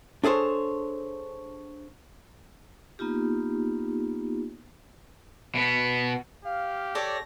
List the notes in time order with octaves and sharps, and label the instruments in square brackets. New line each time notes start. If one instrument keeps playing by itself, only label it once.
[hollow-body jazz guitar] D4 G#4 A4 C5 C#5
[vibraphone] A#3 B3 D#4 F4 G4
[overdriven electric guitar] B2 B3
[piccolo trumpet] G4 [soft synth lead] F5
[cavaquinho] A4 C#5 D5 [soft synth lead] A#6